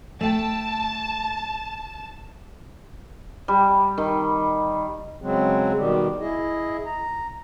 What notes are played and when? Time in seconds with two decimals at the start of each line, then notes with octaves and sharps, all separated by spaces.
0.21 A3 G5 A5
3.48 G3
3.98 D#3
5.22 C#3 F#3 G#3 C4
5.77 B2 D#3 G3
6.20 E4 G#4 D#5
6.86 A#5